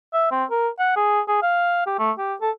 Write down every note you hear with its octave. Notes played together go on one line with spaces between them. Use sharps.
E5
C4
A#4
F#5
G#4
G#4
F5
G4
A3
G4
A4